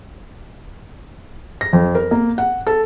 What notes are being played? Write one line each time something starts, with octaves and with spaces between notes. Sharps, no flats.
A#6
F2
A#4
A#3
F#5
A4